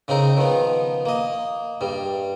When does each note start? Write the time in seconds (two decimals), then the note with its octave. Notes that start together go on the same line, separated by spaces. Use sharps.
0.08 C#3 C4 D#4 A#4
0.37 D#3 F3 B3
1.05 A#3 D#5
1.81 G2 G3